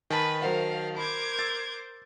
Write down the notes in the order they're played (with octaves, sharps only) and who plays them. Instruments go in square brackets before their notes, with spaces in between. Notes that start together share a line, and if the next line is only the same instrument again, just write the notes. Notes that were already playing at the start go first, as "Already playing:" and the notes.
[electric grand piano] D#3 A5 [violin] B4 [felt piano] G#5
[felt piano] F#3 C5 F#5 [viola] A#4 [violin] F5
[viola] A#4 C5 [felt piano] B5 [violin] D6 G#6
[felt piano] E6 [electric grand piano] A6